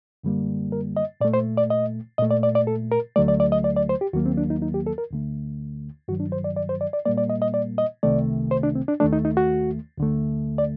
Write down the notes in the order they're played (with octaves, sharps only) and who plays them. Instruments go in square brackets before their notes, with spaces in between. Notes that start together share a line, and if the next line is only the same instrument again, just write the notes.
[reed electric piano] F#2 D3 G3 A#3
A#4
D#5
A#2 D5
A3
C5
D5
D#5
A#2 A3 D#5
D5
D5
D5
A4
A#4
D2 D3 F#3 A3 D5
D5
D5
D#5
D5
D5
C5
G4
D#2 D#3 F#3 A#3 F#4
C4
D4
D#4
D#4
G4
A4
A#4
D2 D3 A3
G2 D#3 F#3 F#4
D4
C5
D5
D5
C5
D5
D5
A#2 G3 A#3 D5
D5
D#5
D#5
D5
D#5
C2 C3 D#3 A3 D5
C5
D4
C4
D4
D#2 D#3 A3 D4
D#4
D#4
F#4
D2 D3 A3
D5